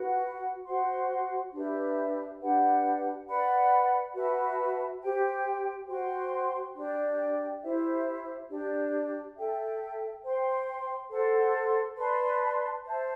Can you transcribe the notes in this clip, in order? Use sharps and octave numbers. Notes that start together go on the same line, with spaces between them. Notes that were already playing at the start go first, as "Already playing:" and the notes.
Already playing: F#4 B4 F#5
F#4 C5 F#5 C6
D4 G4 B4 E5
D4 G4 B4 F#5
B4 D5 F#5 B5
F#4 B4 E5 A5
G4 C5 G5
F#4 C5 G5 C6
D4 G4 D5 G5
E4 G4 C5 E5
D4 G4 D5
A4 E5 G5
C5 G5 C6
A4 C5 F#5 C6
B4 D5 A5 C6
C5 E5 A5